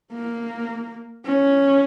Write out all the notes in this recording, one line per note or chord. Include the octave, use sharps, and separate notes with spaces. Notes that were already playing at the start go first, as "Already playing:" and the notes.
A#3
C#4